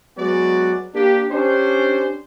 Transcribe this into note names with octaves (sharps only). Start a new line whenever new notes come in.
F#3 G#3 B3 F#4 D5
A#3 D4 G4
C#4 D4 G4 C5